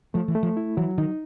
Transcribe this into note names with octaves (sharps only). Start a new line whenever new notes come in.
F3 A3
E3
A3
F3
E4
E3 F#3
D#3 D#4